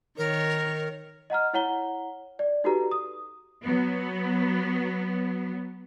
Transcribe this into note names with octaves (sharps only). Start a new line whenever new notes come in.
D#3 A#4 C#5
D#5 F#5 A#5 F6
E4 C#5 F#5 A#5 G7
D5
D#4 F#4 G4 A4 B4 A#5
D#6
F#3 B3